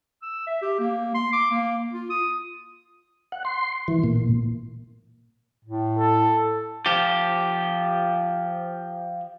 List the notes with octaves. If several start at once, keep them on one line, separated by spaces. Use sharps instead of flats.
E6
E5
G4
A#3
C6
D6
A#3
F4
D#6
F#5
C6
E3
A#2
A2
A4
F3 G4